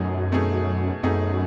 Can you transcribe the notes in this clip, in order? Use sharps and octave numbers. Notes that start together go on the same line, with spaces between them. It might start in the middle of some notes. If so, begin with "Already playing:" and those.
Already playing: F#2 B2 A3 D#4 G#4
B2 A3 D#4 G#4
F#2 B2 A3 D#4 G#4